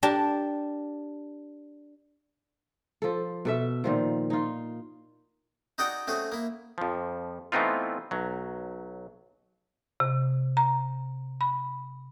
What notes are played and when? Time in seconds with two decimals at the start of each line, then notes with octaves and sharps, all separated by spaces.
0.03 D4 G4 A#4 A5
3.02 F3 A4
3.45 B2 A4 E5
3.84 A#2 D#3 F3
4.30 D#4 F4
5.78 D#4 F#4 G#4 D5 F#5 G5
6.07 A3 C4 C#4 F#4 G#4
6.32 A#3 E4
6.78 F2 F3
7.52 E3 A3 B3 C4 D#4 F4
8.11 B1 F#3
10.00 C3
10.57 A#5
11.41 B5